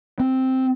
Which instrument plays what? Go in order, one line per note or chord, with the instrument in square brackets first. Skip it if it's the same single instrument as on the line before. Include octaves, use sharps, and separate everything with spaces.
[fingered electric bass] C4